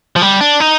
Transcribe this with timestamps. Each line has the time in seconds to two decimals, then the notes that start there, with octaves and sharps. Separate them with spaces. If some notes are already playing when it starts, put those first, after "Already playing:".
0.16 F3
0.22 G3
0.41 D4
0.60 D#4